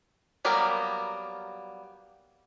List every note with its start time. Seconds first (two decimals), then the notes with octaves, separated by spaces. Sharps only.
0.45 F#3 G3 A#3 B3 A#4